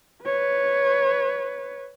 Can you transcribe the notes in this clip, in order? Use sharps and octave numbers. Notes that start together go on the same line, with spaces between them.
B4 C#5